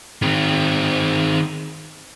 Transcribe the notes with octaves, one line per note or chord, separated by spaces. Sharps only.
D#3 C4